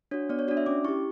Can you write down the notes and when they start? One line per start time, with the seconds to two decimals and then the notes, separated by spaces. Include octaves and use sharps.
0.11 D4 F#4 C#5
0.29 B3 D5
0.39 C#5
0.48 D4 F#4 D5
0.57 E5
0.66 C#4 D6
0.85 E4 G4 C#6